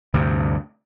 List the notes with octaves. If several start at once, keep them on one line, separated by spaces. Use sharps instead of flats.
D2 G2 C3